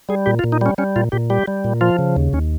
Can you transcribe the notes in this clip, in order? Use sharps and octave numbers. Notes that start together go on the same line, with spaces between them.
G3 G#4
A#2 G4
F4
A#2
D#4
G3 C#4
G3 C#4
A#2 F4
A#2 G4
G3 G4
G3
A#2
F3 F4
C#3
D#2
D#2 C#4